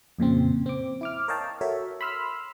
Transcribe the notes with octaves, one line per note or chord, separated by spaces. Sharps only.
F2 A#2 C#3 C4
C4 D6
E4 D6 F6
A#4 C#5 D#5 F5 G5 A5
F#4 A4 A#4 C#5 E5
B5 C6 E6 F6